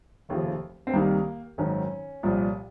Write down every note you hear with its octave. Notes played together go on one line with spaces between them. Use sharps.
F1 D#2 C#3 F3
C4
C2 C3 D#3 A#3
G#1 F#2 D#3 C#4
C2 A#2 F3